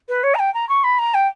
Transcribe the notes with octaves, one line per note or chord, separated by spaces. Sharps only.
B4
C#5
A#5
G5
A#5
C#6
B5
A#5
G5